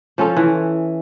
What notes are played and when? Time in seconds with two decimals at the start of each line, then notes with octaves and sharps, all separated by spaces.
0.18 F3 C#4 F4 A4
0.36 E3